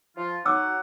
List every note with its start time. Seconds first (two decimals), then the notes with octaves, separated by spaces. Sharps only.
0.17 F3 F4
0.46 F#3 D#4 F#5 D6 E6